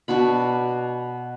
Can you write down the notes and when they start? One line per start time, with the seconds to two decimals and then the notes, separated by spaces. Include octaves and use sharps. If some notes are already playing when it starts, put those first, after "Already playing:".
0.08 B2 D4 F#4 B5